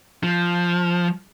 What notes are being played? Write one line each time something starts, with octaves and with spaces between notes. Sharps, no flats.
F3